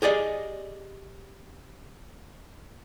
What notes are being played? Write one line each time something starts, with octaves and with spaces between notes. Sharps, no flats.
G4 G#4 D5 D#5